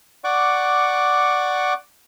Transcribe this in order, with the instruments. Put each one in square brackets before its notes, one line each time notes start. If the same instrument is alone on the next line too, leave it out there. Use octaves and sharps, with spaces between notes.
[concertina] D5 F#5 C#6 D6